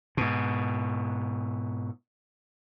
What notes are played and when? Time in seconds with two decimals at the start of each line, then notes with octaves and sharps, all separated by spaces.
0.17 G#2 B2